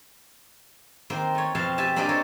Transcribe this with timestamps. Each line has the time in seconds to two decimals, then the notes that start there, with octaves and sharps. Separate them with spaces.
1.10 D#3 A#3 C4
1.35 A3 C#5
1.55 F2 B2 C4 C#5 F5 A5
1.78 G4 E5 G#5 A5
1.96 A#3 C4 D4 G4 D#5 A5
2.09 A#3 A4 C#5